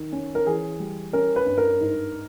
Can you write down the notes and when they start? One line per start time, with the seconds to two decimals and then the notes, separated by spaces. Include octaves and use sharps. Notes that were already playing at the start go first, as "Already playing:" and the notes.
Already playing: D#3
0.12 C#4
0.35 A#4
0.47 E3 G#4
0.80 G3
1.13 C#4 A#4
1.36 B4
1.46 G2
1.58 A#4
1.80 G#2